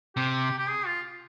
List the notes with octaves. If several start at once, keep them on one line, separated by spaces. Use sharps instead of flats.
C3 G4
G4
G#4
F4